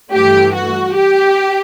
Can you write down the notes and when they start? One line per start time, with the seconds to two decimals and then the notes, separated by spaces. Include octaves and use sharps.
0.12 G2 E3 A3 G4
0.54 F#4
0.95 G4